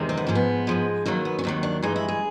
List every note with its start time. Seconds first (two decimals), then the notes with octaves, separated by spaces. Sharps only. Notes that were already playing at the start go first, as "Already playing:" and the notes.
Already playing: E2 C3 D#3 G#3
0.09 C4
0.17 B3
0.27 G#2 F3 G#3 A#3
0.35 B3
0.67 G#2 F3 G#3
1.06 D#2 D#3 F#3 A#3
1.25 B3
1.39 C#4
1.44 D#2 D#3 F#3 C4
1.63 D4
1.82 G2 E3 G#3 D#4
1.96 E4
2.08 G#4